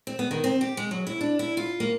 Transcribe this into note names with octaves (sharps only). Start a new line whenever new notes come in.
C4
B3
D#3
C4
G4
G#3
F#3
E4
D4
E4
F4
A#3